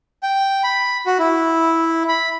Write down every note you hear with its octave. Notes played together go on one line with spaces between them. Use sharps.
G5
B5
F#4
E4
B5